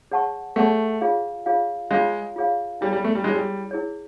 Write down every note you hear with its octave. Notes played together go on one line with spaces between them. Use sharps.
G#4 C#5 F#5 A5 C#6
A3 G#4 C#5 F#5 A5 C#6
F4 G#4 C#5 F5
F4 G#4 C#5 F5
G#3 F4 G#4 C#5 F5
F4 G#4 C#5 F5
G3 E4 G#4 C#5
G3
A3
G3
G#3 E4 G#4 C#5
G3
E4 G#4 C#5